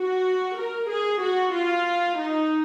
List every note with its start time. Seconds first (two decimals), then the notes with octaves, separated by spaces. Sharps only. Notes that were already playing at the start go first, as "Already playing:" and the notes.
Already playing: F#4
0.57 A#4
0.90 G#4
1.21 F#4
1.53 F4
2.18 D#4